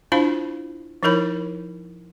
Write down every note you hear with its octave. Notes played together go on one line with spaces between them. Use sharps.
D4 E4 F4 C5 F5 B5
F3 D#4 E4 A#4 C#5 B5